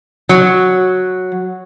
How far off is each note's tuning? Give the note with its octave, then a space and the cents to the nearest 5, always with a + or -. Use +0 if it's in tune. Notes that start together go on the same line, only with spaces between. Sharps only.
F#3 -5